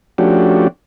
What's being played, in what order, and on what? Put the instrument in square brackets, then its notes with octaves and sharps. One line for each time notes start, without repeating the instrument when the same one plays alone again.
[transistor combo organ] F3 A3 C#4 D4 F#4 G4